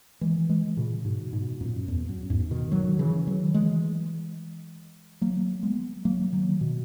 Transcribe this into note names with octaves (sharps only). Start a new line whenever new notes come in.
E3 G#3
E3 G#3
A#2 C#3
G#2 B2
G#2 B2
F#2 A#2
E2
F#2
E2 G#2
B2 D#3
D#3 F#3
C#3 E3
D#3 F#3
E3 G#3
F#3 A#3
G#3 B3
F#3 A#3
D#3 F#3
B2